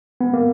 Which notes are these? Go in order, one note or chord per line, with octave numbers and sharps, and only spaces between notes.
B3
A#3